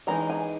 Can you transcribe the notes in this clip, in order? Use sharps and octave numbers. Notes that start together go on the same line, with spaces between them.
E3 G#3 D#4 A#5
G#5